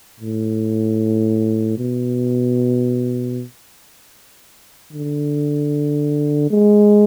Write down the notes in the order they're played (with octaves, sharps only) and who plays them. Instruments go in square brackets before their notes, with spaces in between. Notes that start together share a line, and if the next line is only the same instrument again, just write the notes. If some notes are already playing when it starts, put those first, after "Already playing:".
[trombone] A2
B2
D3
G#3